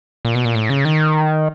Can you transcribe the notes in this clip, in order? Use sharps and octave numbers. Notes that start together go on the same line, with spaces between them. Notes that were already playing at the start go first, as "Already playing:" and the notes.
A#2
B2
A#2
A2
C#3
D#3